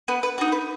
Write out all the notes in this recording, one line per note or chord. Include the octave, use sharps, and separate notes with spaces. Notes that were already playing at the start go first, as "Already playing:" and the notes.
B3 B4
B4
D#4 F#4
B4